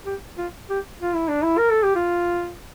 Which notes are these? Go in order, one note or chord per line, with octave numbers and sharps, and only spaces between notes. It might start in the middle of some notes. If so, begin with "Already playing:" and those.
G4
F4
G4
F4
E4
D4
E4
A#4
A4
G4
F4